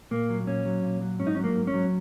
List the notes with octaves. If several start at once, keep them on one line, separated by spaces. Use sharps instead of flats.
A#2 A#3
F#3
A#2 C#4
F#3
A#2
F#3
G#2 C#4
D#4
F#3 C#4
A#3
G#2
C#4
F#3